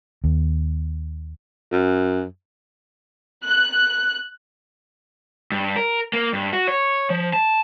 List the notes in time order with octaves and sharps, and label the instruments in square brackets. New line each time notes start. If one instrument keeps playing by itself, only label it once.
[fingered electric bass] D#2
[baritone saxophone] F#2
[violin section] F#6
[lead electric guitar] G2
A#4
A#3
G2
F#4
C#5
F3
A5